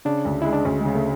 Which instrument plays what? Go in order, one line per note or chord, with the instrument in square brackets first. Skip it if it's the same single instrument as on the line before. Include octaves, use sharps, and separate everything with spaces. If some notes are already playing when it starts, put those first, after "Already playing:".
[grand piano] C#3 [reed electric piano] D4
[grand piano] D2
[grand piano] G#3 [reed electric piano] E4
[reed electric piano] D4
[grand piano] D2 [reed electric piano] C#4
[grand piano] C#3 [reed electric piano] G#3
[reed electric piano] A3